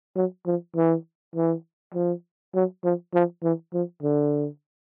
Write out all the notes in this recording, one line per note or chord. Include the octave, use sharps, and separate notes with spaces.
F#3
F3
E3
E3
F3
F#3
F3
F3
E3
F3
D3